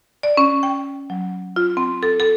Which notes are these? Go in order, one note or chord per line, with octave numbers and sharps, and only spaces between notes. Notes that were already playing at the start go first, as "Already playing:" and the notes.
D5
C#4
G5
F#3
F4
C4
A4
A4